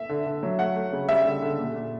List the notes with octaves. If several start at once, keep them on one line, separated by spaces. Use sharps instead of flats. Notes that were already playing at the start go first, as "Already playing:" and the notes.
Already playing: E5
D3
D3
F#3
A3 F#5
A3
C#3
G3 E5
D3
D3
A#2
A#2